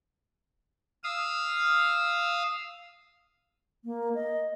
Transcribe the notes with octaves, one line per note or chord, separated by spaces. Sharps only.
F5 D#6 E6
A#3
D#5